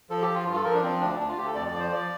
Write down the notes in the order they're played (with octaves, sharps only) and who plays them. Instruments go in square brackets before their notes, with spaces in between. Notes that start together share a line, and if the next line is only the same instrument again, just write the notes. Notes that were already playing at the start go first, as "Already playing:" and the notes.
[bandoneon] F3 A4
G4
F3
F4
G2 F4
A4
F3 A#4
D4
F3 C4
D2 D4
D2 D4
F4
D2 G4
A4
F2 D5
D5
F3
C5
F3 D5